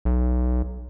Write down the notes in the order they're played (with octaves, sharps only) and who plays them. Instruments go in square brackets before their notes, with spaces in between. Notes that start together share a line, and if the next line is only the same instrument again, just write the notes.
[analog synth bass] B1